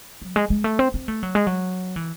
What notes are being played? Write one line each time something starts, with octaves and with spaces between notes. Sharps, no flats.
F#3
G#3
G#3
A3
C4
C4
A3
F#3
G#3
F#3
E3